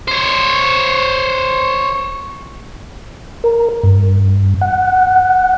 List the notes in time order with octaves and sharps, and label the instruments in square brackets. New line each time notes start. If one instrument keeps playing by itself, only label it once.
[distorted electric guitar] C5 C#5
[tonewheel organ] A#4
G2
F#5